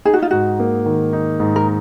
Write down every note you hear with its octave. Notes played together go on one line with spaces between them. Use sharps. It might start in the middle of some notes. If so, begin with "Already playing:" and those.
D#4 G#4
F#4
F4
G#2 F#4
A#3
D#3
D#4
G#2
A#4